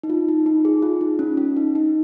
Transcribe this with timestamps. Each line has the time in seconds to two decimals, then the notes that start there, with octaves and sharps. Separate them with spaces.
0.03 D#4
0.10 F4
0.28 D#4
0.46 D#4
0.65 G#4
0.82 F4
1.01 D#4
1.19 C#4
1.37 C#4
1.57 D#4
1.75 D#4